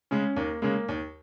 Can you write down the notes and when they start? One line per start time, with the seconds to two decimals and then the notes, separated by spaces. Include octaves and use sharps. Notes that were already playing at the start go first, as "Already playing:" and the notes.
0.11 C#3 G#3 C#4
0.36 D#2 A#3
0.62 C#3 G#3 A#3
0.88 D#2